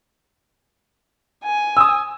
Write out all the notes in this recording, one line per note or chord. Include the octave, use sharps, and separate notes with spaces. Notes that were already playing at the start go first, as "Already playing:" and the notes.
G#5
D#6 E6